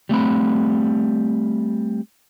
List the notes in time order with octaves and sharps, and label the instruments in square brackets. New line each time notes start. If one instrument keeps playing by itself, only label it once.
[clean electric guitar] G3 A3 C4 B5